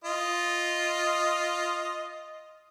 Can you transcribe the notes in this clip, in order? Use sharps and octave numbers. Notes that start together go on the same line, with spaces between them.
F4 D#5